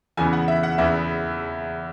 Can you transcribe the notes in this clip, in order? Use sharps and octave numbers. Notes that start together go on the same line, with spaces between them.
E2 C#3 E3 B3 G#5
F#5
E5
F#5
E2 C#3 E3 B3 E5